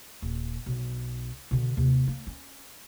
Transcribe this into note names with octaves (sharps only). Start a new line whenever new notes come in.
D#1
B1
B2 D3
D#2 C3
A#3
C#4